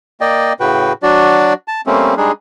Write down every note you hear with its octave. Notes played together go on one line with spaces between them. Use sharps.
A#3 D5 D#5 G5
A2 C#3 F#4 B4 G5
F#3 D4 F#4 D5
A5
G3 A3 A#3 C4 C#4
G3 G#3 D4 D#4 G#4